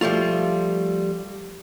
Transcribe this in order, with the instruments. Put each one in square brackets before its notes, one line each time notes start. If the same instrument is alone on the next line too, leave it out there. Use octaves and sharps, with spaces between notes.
[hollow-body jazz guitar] F3 G3 A3 F4